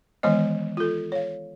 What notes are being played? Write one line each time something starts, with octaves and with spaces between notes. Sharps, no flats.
D#3 E3 G#3 B3 C5 D#5
F4 A4
C#5 F5